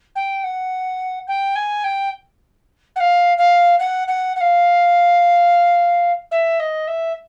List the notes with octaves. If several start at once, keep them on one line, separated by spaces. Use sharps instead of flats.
G5
F#5
G5
G#5
G5
F#5
F5
F5
F#5
F#5
F#5
F5
E5
D#5
E5